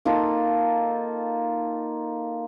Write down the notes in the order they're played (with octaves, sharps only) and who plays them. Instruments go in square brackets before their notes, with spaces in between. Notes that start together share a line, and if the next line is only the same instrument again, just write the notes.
[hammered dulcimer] A#3 D#4 F4 A4